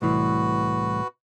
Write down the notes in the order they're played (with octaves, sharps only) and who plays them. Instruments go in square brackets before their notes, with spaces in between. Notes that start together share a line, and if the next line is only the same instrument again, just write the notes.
[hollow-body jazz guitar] C2 A2 E3 [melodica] F#4 B4